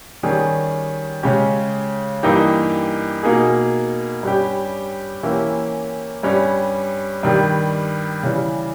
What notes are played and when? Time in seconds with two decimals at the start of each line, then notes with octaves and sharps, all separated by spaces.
0.23 D#3 G3 C#4 G#4
1.23 C#3 G#3 C#4 G4
2.23 G2 E3 A#3 D#4 G4
3.23 B2 A#3 D#4 G#4
4.23 G2 G3 C#4 G4
5.23 E3 A#3 C#4 E4 G4
6.23 G2 G3 C#4
7.23 G2 D#3 G3
8.23 C#3 E3 G3